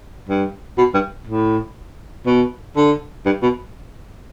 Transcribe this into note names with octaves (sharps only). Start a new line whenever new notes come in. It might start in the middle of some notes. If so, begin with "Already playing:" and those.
G2
B2
G2
A2
B2
D3
G2
B2